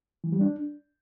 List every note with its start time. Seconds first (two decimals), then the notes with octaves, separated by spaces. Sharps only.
0.24 E3
0.32 G3
0.41 D4